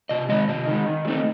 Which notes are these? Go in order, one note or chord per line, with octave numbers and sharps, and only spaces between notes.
C3 D#5
D#3 G#3 D#5
C3 D#5
D#3 G#3
D#3
F#3 A3 C4 D#4